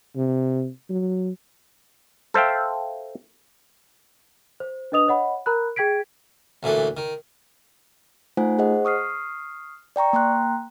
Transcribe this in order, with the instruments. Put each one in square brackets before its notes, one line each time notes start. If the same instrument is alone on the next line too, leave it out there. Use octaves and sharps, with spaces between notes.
[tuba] C3
F#3
[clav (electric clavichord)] A4 C5 E5 F5 G5
[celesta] C5
D4 B4 D#5 D#6 F7
C#5 D#5 F#5 B5
A#4 A#5 B5 F#6
G#4 G5 G#6 B6 D7
[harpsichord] D2 A#2 E3 A3
D#3
[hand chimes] A3 D#4 F4 C5 F#5 G#5
G#4 C5 D#5 F#5
C#6 D#6 F6 C7
D5 G5 A#5 C#6
A#3 G5 A#5 C6 F#6